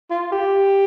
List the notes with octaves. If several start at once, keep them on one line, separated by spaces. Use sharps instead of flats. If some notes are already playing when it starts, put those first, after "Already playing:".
F4
G4